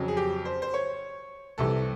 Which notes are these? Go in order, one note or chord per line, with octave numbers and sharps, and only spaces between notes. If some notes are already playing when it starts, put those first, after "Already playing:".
Already playing: F2 C#3 F#3
G#4
G4
C5
C5
C#5
C2 C3 E3 A4